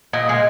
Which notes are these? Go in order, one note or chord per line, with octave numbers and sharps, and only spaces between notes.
A#2 D#5
G#3